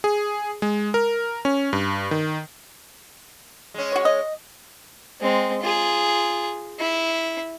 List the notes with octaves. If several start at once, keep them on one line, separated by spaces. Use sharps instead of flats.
G#4
G#3
A#4
C#4
G2
D#3
G#3 C#4
F#4 C#5
D#5
G#3 C4
F4 G#4
E4